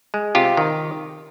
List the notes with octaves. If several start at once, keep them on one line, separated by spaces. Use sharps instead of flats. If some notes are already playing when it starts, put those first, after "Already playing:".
G#3
C3 F4 G4
D#3